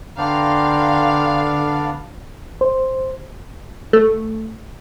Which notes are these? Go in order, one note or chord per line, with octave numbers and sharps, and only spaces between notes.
D3 B3 D4 D5 F5 G5 A#5 C6
C5
A3